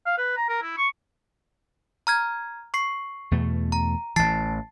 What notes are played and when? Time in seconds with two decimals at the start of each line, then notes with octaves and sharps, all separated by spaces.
0.06 F5
0.18 B4
0.36 A#5
0.49 A#4
0.62 E4
0.78 C#6
2.07 A#5 F6 G#6
2.74 C#6 C7
3.31 E2 B2 A3
3.72 A#5
4.16 A1 E3 A5 A6 C7